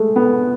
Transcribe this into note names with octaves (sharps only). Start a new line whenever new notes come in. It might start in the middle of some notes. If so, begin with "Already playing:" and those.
Already playing: G#3 A3
B3